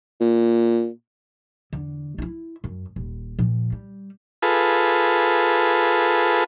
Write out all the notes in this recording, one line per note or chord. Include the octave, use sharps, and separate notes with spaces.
A#2
E2 D3
D#4 E4
F#2
D#1
A#2 F3
G3
F4 G#4 A4 B4